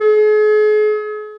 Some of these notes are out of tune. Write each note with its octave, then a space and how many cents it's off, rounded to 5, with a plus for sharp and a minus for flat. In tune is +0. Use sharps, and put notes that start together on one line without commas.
G#4 +40